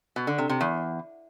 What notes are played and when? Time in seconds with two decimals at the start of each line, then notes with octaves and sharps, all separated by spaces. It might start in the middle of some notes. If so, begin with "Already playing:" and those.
0.16 B2
0.27 D3
0.38 C3
0.49 C3
0.61 E2